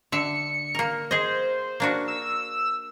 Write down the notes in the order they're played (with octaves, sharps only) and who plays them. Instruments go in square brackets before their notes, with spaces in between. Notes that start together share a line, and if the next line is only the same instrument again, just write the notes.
[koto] D3 E5 [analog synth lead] C#7
[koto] A#3 A#4
[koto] G#4 D#5 [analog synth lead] C5
[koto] A#3 D4 F#4
[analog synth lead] E6